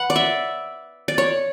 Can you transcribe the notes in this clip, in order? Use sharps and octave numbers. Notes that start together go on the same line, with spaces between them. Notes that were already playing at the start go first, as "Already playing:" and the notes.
Already playing: B4 F#5
D5
E5
D5
C#5